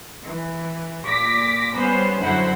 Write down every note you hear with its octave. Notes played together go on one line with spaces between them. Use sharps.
E3
A#2 D6 A#6 B6
G3 B3 C#4 C5
F#2 D3 F#3 E4 C5 F#5